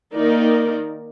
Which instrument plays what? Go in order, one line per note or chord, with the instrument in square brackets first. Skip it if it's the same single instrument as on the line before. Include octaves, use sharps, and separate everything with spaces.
[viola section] D#3 A#3 D#4 A#4 D5